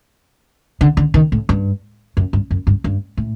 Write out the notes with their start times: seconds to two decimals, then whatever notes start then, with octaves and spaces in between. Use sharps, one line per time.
0.81 D3
0.97 D3
1.14 D#3
1.32 A2
1.49 G2
2.17 F#2
2.33 G2
2.51 F#2
2.67 G2
2.84 G2
3.17 A2